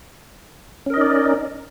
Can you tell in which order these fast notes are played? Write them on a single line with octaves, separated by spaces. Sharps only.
C#4 A#4 D#5 D#4 D5